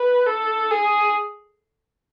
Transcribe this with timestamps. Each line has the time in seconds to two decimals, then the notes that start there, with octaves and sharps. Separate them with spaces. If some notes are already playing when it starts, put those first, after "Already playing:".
Already playing: B4
0.26 A4
0.71 G#4